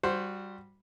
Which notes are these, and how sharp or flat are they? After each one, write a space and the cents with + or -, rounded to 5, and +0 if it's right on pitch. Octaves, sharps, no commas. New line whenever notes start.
G3 +0 F#4 -25 C5 +0